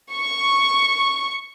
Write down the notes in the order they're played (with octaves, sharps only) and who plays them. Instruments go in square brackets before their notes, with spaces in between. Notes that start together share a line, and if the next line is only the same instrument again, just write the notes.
[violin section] C#6